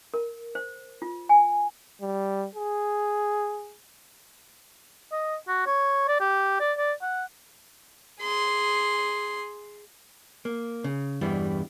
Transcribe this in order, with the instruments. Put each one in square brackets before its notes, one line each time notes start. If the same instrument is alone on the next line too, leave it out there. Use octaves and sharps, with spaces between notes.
[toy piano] A#4
C5
F4
G#5
[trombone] G3
G#4
[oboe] D#5
F#4
C#5
D5
G4
D5
D5
F#5
[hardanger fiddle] G#4 C6
[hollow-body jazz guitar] A#3
C#3
E2 G2 E3 G3 B3